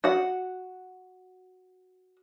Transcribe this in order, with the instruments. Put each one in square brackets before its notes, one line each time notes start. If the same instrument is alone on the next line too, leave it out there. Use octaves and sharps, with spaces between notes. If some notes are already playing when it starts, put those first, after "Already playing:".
[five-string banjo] F#4 F#5